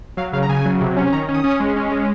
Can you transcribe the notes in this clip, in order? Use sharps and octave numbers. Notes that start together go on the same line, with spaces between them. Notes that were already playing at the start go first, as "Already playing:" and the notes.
F#3 F5
C#3 F5
A#5
C#3 G#5
F#3
C3
C#4
D#3 A#5
C#4
D#6
C#4
G#3
C#4
G#3